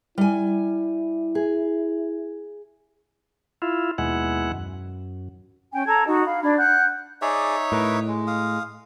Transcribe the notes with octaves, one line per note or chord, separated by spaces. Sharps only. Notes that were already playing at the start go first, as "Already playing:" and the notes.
G3 E4 G#5
G#4
E4 F4
D#2 B2 G#3 E4 F#5
F#2
C#4 G5 G#5
A4 A5 A#5 G#6
D#4 F#4 D#5
F5 B5
D4 B5 G#6
F#5 F#6 G6
D#4 G#4 C#5 D5 E5
A2 A#4 B4
G#3
F5 D#6